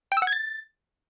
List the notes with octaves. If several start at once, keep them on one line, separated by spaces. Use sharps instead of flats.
G5
E6
F#5
G#6
A6